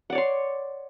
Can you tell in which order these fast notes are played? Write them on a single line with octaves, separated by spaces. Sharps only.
F#5 D5 C#5 C6